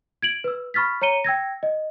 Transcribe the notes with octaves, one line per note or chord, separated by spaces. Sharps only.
G#6 D7 F#7
B4 E6
B5 C#6 F6 A6 B6
C#5 A#5 C#7 D#7 G7
G5 E6 G#6 A#6
D#5